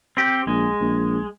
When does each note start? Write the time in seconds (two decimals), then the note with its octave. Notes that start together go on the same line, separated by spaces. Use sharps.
0.17 C4 G4
0.47 A#1 G#3
0.81 A#1